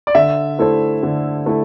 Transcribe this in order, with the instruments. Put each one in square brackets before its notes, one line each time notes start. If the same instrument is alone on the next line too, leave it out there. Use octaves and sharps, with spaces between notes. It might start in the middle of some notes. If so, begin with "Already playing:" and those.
[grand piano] D5
[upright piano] D3 [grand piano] E5
[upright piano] A3 E4 A4 C5
D3
A3 E4 A4